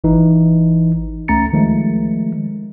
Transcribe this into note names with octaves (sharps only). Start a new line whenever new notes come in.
G#1 E3 D#4
C#2 A3 C#4 A#5 A6 C#7
D#3 F3 G#3 A3